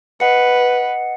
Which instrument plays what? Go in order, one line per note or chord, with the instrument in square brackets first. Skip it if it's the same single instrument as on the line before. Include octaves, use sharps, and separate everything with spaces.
[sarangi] B4 [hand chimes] D#5 F#5 C#7